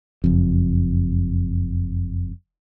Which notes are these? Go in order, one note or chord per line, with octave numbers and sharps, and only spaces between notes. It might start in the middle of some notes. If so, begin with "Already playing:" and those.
F#1 F2